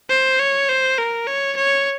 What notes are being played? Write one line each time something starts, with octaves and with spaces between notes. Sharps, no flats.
C5
C#5
C5
A#4
C#5
C#5